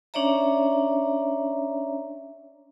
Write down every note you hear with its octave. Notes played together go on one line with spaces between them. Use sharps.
C#4 D4 C#5 D5 E5 A#5